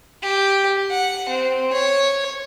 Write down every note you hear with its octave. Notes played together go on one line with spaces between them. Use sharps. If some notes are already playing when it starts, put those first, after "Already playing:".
G4
F#5
C4
C#5